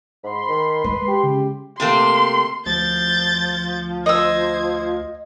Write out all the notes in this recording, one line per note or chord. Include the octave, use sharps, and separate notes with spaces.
G#2 B5 C6
D#3
G#3 B4
G4
C#3
C3 A3 A#3 C6
D2 F3 G6 A6
C5 D#5 E6 G#6